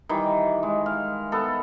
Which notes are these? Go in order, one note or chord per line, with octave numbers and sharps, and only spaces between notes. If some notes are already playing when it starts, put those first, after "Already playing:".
D#3 E3 G3
G#3
F5
B3 A4